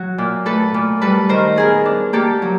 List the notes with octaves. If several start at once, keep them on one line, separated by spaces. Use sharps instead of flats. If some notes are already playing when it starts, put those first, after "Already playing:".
Already playing: F#3 F#4
A#2
A3 A4 B4
A#2
G3 A4 B4
D#3 A#4 C5
B3 G#4 A#4
D4
A#3 G4 A4
F#3